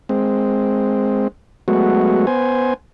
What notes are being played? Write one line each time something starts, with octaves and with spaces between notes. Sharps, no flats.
G#3 C4
F#3 G#3 A3 B3 F#4
B3 C5 G#5